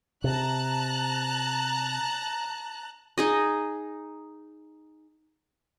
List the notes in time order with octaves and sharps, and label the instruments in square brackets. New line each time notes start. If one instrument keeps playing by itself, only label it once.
[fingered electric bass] C3 [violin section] A5 A#5 F#6
[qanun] D#4 G#4 D#5